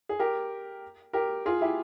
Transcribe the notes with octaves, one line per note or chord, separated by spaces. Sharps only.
G#4
G4 A#4
G4 A#4
F4 G#4
E4 G4